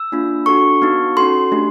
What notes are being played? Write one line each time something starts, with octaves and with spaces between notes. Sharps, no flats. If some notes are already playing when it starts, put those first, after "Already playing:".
Already playing: E6
A#3 D4 F4
D4 F#4 A4 C#6
B3 D#4 F#4
C#4 F#4 A4 C6
A3 D4 G4